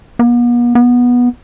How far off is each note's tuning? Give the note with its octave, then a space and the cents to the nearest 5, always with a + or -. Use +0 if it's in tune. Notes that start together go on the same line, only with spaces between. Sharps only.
B3 -45
B3 -15